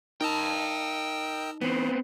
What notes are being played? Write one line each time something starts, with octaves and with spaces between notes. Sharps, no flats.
D#4 A#4 D#5 G5 A5 E6
E3 B3 C4